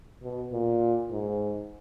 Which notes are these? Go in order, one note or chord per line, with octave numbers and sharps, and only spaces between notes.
B2
A#2
G#2